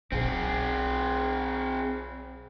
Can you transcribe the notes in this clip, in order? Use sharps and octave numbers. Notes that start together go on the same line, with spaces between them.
B1 C4 G#4